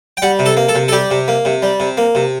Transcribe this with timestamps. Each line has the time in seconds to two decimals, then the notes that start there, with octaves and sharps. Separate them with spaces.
0.17 G5
0.22 G3 F#5
0.39 C3
0.46 A4
0.57 A#3
0.68 A4
0.75 C3
0.88 A4
0.92 G3 G4
1.11 C3
1.28 A#3
1.45 C3
1.62 G3
1.80 C3
1.97 A#3
2.15 C3